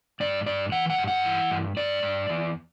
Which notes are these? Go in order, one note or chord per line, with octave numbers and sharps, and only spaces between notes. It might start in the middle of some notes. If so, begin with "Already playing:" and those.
G2 D5
G2 D5
E3 F#5
F#5
G2
F#5
E3
G2
G2 D5
G2
E2